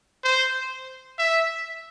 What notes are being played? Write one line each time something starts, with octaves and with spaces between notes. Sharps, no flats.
C5
E5